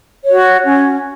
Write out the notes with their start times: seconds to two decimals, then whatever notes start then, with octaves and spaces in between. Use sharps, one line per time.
0.26 F#4 C#5
0.64 C#4